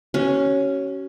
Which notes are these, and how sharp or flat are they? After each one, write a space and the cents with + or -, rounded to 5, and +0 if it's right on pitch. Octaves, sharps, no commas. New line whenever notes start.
C#4 +0 F#4 +45